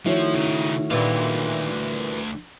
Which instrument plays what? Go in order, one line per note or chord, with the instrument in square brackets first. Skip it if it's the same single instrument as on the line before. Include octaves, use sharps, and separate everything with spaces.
[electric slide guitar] D#3 A3 [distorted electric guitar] F3 [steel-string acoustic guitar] E4 F#4 C#5
[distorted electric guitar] C#3 D#4
[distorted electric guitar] D2 F5 [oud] A#2 E3 G3